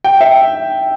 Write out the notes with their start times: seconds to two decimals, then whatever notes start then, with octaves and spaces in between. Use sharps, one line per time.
0.04 G5
0.21 E5